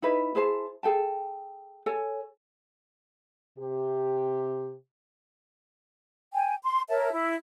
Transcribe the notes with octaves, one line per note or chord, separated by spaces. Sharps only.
D#4 E4 B4
E4 G#4 C5 A5
G#4 A4 G5 A5
A4 C#5 G#5
C3 G4
G5 G#5
C6
A#4 C#5 E5 A5
E4